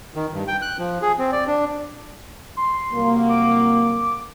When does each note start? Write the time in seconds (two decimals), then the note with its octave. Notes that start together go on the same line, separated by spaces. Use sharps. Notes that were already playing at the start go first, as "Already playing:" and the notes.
0.15 D#3
0.33 G2
0.48 G5
0.62 F#6
0.79 F3
1.02 G#4
1.18 C4
1.32 D5
1.47 D4
2.57 C6
2.93 C2 F#3 A#3
3.29 D6